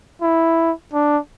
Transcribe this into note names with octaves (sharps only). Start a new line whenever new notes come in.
E4
D4